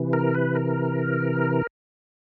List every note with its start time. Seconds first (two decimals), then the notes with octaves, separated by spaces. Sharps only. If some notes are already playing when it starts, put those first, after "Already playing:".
Already playing: C3 E3
0.13 A#4
0.35 B4
0.55 A#4